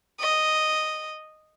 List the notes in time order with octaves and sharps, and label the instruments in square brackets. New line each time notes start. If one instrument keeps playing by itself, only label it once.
[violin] D#5